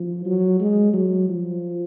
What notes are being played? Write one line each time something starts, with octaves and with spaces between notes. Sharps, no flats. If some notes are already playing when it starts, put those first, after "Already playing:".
Already playing: F3
F#3
G#3
F#3
F3